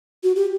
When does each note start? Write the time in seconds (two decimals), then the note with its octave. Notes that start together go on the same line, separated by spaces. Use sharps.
0.23 F#4
0.36 G4